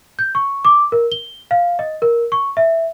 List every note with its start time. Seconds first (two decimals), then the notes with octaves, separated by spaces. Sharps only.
0.19 G6
0.35 C#6
0.65 D6
0.92 A#4
1.12 G7
1.51 F5
1.79 D#5
2.02 A#4
2.32 C#6
2.57 E5